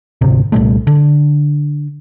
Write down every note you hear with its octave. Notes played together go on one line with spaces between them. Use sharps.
G#1 D2 C3
C2 A#2 G3 A3
D3